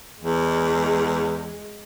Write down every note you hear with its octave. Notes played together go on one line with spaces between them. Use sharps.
E2 G#3